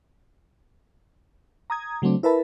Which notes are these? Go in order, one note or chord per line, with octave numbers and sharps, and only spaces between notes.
A#5 D#6 G#6
C#3 F#3 A3 C4 D4
E4 A#4 B4 E5 A5 B5